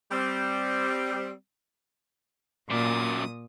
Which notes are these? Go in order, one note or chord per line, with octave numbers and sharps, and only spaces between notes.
G3 C4
F#2 A#2 D5 D#6